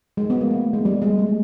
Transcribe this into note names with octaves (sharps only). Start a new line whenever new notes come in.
G#3
B3
A#3
A3
G#3
G3
G#3
A3